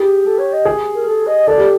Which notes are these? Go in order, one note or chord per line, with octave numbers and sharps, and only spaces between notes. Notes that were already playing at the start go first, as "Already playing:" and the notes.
Already playing: G4 G#4
A4
C#5
D#5
G#4
A#4
A4
D#5
A4 D5
G4